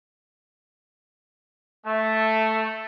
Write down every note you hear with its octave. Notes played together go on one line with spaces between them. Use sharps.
A3